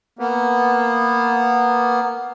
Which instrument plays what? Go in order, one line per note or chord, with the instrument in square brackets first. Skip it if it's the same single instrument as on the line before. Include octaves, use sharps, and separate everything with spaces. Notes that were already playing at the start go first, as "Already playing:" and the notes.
[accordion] A#3 B3